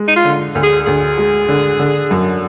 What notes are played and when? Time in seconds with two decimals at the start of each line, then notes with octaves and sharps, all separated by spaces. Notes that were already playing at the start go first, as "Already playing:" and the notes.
Already playing: G#3
0.08 D#4
0.16 F4
0.25 D3
0.55 D2
0.63 G#4
0.86 D2 G#4
1.18 G#3
1.49 D3
1.79 D3
2.11 F#2